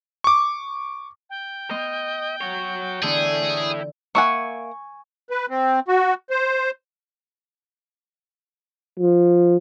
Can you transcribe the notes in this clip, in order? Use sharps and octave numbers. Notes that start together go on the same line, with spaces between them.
C#6 D6
G5
B3 D#5 C6 F6
F#4 C#5
D3 E3 B3 E4 G#4 A4
A#3 E5 F#5 G#5 C#6
B4
C4
F#4
C5
F3